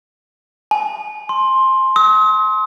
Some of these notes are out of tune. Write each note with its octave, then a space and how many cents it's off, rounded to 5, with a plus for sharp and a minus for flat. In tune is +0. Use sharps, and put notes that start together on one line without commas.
G#5 +40
C6 +10
D#6 +45